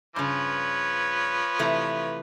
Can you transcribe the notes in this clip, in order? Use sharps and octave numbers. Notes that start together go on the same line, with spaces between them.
G2 C#3 F3 B4 C#5
C3 E3 A3